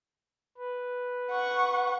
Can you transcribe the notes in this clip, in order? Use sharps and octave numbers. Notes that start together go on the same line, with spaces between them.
B4
F#5 C#6